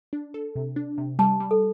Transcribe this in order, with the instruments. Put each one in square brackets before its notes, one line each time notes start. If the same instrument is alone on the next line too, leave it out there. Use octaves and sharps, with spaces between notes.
[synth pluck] D4
A4
C3
D4
C3
[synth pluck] G3 [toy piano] A5
[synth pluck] G3
[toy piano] A4